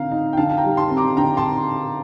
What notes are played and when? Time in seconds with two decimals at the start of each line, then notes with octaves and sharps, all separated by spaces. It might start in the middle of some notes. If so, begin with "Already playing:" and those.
Already playing: D3 C4 F5 A#5
0.11 D#4
0.33 G5
0.37 D3 F5 A5
0.49 A5
0.57 G5 A#5
0.64 G3
0.77 A5 C6
0.90 C4
0.97 A#5 D6
1.17 D3 G5 A#5
1.37 A5 C6